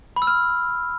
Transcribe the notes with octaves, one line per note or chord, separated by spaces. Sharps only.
B5
E6
F6